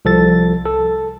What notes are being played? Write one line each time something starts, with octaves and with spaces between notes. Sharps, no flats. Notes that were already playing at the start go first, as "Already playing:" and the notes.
C2 F3 A4 A6
A4